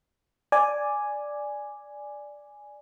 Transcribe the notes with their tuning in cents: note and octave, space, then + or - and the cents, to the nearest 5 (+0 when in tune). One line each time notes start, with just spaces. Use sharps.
D5 +0 G#5 +0